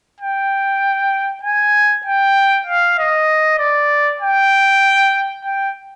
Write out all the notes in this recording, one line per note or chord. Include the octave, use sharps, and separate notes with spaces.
G5
G#5
G5
F5
D#5
D5
G5
G5